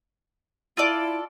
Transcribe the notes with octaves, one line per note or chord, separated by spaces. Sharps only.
E4 F4 A4 D5